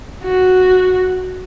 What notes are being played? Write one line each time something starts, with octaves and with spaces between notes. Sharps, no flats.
F#4